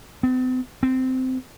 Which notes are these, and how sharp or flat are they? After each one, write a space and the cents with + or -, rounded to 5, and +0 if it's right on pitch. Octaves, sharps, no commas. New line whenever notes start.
C4 -45
C4 -15